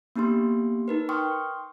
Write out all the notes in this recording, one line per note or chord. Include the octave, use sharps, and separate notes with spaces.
A#3 B3 D4 G4 C6
D#4 A#4 B4
G5 C6 C#6 D#6 F6